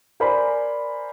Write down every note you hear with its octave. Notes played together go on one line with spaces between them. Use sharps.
A#4 C5 D5 G#5 B5